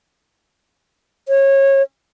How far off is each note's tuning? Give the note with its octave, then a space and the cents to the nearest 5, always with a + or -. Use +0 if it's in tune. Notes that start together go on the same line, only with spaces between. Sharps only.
C#5 -25